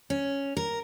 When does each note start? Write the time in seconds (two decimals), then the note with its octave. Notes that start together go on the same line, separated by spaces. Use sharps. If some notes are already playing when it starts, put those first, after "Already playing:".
0.10 C#4
0.57 A#4